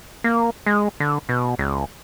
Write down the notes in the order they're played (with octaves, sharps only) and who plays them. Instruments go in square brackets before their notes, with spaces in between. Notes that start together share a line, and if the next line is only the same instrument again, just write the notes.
[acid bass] A#3
G#3
D3
B2
C#2